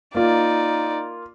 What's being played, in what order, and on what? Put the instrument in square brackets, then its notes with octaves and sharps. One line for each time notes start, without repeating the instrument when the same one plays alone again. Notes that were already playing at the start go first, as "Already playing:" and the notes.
[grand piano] A#3 F4 [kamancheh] D#4 D5